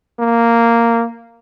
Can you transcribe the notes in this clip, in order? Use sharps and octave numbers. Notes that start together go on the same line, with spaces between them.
A#3